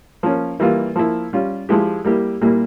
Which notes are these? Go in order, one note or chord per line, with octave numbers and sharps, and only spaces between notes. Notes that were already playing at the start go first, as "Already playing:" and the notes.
F3 A#3 C#4
E3 G3 A#3 F4
F3 A#3 E4
G3 C#4 F4
F3 G#3 E4 G4
G3 A#3 E4 G4
A#2 G3 A#3 E4